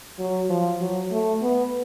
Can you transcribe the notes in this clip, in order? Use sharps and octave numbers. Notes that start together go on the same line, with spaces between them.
F#3
F3
F#3
A3
B3